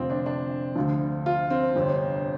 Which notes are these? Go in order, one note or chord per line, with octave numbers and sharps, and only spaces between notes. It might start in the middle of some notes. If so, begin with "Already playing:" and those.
Already playing: F1 F2 D3 F3 C4
D4
D4
D2 D3 F3
F4
C4
G1 F2 C3